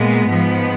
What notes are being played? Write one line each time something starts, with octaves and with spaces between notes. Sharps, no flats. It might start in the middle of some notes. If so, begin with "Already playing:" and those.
Already playing: A#2 G#3 B3
G#2 F3 G#3